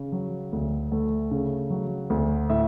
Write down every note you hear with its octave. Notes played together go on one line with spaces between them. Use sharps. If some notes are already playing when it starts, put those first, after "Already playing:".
Already playing: C#3
F#3
D2
A3
C#3
F#3
D2
A2 E5